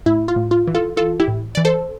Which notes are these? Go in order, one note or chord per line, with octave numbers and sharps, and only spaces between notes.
A2 E4
F4
A2
F4
E3
F4 A4
E3 F4 A4
E4 G4
A2
E3 D5
A4 C5